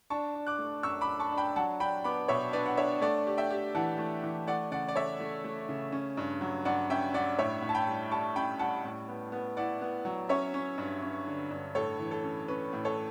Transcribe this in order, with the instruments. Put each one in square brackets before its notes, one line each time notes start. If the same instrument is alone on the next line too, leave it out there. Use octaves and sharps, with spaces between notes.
[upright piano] D4 [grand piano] A5 C#6
[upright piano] D4
[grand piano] D6 F#6
[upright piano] A3
[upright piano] F#2 [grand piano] C#6 E6
[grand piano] B5 D6
[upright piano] D4
[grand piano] A5 C#6
[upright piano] D4
[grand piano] G5 B5
[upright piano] F#3 [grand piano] F#5 A5
[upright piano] D4 [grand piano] G5 B5
[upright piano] B3 [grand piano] B5 D6
[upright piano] B2 [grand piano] C#5 E5
[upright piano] D4 [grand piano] B4 D5
[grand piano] F#5
[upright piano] D4 [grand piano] C#5 E5
[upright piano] A3 [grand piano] D5 F#5
[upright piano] G4
[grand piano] E5 G5
[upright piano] G4
[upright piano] E3 [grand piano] F#5 A5
[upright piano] A3
E3
[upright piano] A3 [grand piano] D5 F#5
[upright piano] C#3 [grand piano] D5 F#5
[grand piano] D5
[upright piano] A3 [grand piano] C#5 E5
[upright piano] A3
A3
C#3
C#4
G2
F#3
[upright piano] G2 [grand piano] D5 F#5
[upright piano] C#4 [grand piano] E5 G5
[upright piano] G2 [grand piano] D5 F#5
[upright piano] A2 [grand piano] C#5 E5
[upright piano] A2
[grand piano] A5
G5 B5
[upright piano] G3
[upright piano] G3 [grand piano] A5 C#6
[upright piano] C#4 [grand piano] G5 B5
[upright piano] G3 [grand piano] F#5 A5
[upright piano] A2
B3
B3
[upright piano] E4 [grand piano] D5 F#5
[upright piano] B3
F#3
[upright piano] C#4 [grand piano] C#5 E5
[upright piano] C#4
G2
C#4
D3
G2
[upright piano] A2 [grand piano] A4 C#5
[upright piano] E3
[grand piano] A4
[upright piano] C#4
[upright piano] C#4 [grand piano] B4
[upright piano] A2
[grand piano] A4 C#5